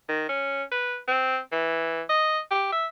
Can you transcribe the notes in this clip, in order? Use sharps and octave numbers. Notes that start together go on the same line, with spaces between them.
D#3
C#4
B4
C4
E3
D#5
G4
E5